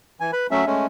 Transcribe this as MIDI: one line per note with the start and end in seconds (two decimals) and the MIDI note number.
0.20 0.31 52
0.20 0.31 80
0.33 0.47 71
0.33 0.47 83
0.51 0.65 54
0.51 0.65 57
0.51 0.65 61
0.51 0.65 76
0.66 0.86 56
0.66 0.86 57
0.66 0.86 61